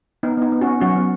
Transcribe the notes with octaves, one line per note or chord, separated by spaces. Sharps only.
B3 D#4
B3 D#4
B3
C#4 F#4
B3
F#3 C#4 F#4
B3